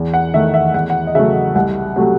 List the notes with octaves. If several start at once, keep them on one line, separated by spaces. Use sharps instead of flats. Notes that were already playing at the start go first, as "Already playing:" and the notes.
Already playing: E2
F#5
D#3 A3 E5
E5
E2 F#5
F#5
D#5
C#3 F#3 A3 E5
C2 F#5
C3 F#3 A3